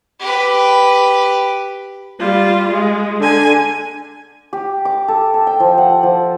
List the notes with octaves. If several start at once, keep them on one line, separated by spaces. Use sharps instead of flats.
G4 B4
G3 F4
G#3
D3 G#5
G4
D6
A4
A5
G5
F3
F#5
F3